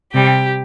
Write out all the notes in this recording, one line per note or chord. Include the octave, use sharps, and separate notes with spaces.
C3 G3 G4